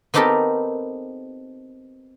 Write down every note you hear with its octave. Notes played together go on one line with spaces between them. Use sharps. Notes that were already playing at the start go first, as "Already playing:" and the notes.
B3 C4 D#4 G4 A4 A#4